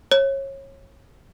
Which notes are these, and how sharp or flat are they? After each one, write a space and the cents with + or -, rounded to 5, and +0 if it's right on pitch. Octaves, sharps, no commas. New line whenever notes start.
C#5 -25